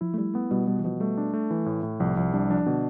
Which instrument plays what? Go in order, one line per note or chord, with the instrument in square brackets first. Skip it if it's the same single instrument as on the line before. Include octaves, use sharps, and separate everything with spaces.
[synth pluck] F3 [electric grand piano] E4
[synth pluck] A3
[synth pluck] G3 [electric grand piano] E4
[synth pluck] A3 [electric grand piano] B3
[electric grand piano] B2 [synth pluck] G3
[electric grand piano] B2 [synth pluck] G3
[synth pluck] E3
[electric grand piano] B2 [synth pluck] F3
[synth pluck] G3 [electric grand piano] A3
[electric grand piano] D4
A3
E3
A2
A2
[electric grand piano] C2 [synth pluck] F3
[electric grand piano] C2 [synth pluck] F3
[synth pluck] G3 [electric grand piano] D4
[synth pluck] F3 [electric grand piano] D4
[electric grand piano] B2 [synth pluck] D3